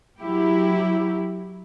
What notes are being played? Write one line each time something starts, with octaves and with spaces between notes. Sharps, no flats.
F#3 E4 G4